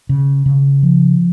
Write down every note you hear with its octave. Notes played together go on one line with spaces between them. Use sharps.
C#3
C#3
F3